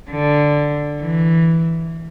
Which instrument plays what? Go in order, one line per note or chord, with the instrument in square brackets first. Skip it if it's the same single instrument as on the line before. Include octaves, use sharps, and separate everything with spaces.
[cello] D3
E3